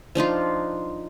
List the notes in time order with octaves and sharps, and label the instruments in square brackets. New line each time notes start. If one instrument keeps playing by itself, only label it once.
[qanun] F3 D4 D#4 F4